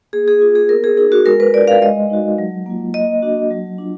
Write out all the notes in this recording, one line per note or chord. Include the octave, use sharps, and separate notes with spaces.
A#3 G#4
G#4
F4
G#4
B3 A#4
G#4
D#4 F#4 G#4
F#4
G#3 A#4
B4
D4 F4 D5
F5
G#3 D#5
D#4 F#4
F#3
A#3 F4
A#3 D#5
D4 F#4
F#3
D4 F4